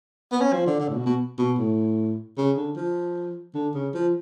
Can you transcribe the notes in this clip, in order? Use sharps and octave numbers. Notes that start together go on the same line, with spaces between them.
B3
C#4
F3
D3
D3
A2
B2
B2
B2
A2
C#3
D3
F3
D3
C#3
F3